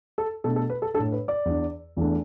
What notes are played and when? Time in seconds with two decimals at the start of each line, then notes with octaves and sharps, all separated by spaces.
0.18 A4
0.44 B2 A3 D4 A4
0.56 A4
0.70 B4
0.82 A4
0.94 A2 A3 D4 A4
1.12 B4
1.28 D5
1.45 E2 E3 D4
1.96 E2 E3 A3 D4